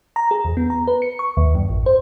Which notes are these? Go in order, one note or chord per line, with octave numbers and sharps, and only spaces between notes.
A#5
G#4
E2
B3
A#5
B4
C#7
C#6
D#2
F#2
A1
C5